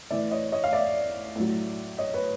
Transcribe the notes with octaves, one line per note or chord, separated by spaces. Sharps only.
A2 E3 D5 E5
C#5 D#5
C#5 D#5
F5
D5 E5
A2 F#3
C#5 D#5
B4 C#5